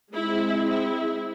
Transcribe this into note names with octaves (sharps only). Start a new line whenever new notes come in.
G#3 C4 E4
E4